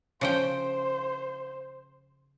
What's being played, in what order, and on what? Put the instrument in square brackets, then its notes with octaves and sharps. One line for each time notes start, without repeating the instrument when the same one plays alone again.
[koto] C#3 F3 G5 [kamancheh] C5